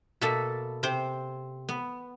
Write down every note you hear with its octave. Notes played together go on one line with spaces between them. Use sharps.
B2 A#3 A4 E5 A5
C3 C4 C5
B3